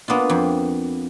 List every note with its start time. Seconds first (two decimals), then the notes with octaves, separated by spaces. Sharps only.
0.08 A#3 B3 D4 F4
0.29 F2